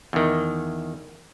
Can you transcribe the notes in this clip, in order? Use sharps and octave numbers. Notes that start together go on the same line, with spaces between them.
E2 D#3